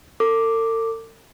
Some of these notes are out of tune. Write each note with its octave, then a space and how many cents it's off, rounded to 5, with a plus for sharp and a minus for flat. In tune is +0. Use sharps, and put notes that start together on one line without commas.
A4 +45 D6 +0